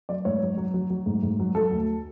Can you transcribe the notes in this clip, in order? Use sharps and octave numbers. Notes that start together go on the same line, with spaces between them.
F#3 D5
G#2 C#5
F#3
F#3
F#3
F#3
G#2
G#2
F#3
F#3 A4
D2